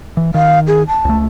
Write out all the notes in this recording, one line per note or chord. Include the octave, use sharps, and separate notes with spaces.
E3
D#3 F5
G#4
A5
C#2 A3